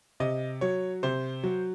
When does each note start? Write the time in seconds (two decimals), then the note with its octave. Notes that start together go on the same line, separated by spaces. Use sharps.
0.20 C3 D#5
0.61 F#3 C#5
1.03 C3 C5
1.43 F#3